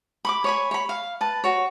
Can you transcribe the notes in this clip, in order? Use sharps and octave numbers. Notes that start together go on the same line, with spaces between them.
B5 C#6 D6
C#5 G#5 B5
C#5 B5
F5
B4 A5
F#4 C#5